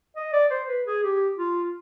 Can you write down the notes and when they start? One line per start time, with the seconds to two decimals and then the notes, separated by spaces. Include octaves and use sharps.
0.16 D#5
0.33 D5
0.50 C5
0.69 B4
0.87 G#4
1.04 G4
1.38 F4